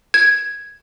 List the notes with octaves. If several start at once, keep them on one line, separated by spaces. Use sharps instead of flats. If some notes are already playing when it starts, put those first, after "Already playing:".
G#6